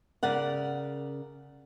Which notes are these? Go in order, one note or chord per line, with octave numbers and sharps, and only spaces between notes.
C#3 A#4 D5 F#5